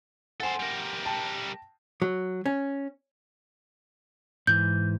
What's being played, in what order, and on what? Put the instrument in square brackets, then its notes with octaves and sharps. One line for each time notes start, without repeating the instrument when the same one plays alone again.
[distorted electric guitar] A4 C5 [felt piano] F#5 G#5 C6
[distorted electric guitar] G3 A#4
[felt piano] G5 A5
[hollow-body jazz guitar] F#3
C#4
[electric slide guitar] G#2 E3 [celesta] G6